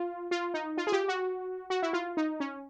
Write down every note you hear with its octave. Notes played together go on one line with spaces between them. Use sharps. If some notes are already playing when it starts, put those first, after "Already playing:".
Already playing: F4
F4
D#4
F4
G#4
G4
F#4
F#4
E4
F4
D#4
C#4